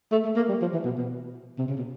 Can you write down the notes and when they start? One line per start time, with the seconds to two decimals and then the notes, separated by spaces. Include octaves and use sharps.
0.12 A3
0.25 A3
0.36 A#3
0.49 G3
0.62 F3
0.73 E3
0.85 B2
0.98 B2
1.58 C3
1.68 C#3
1.77 B2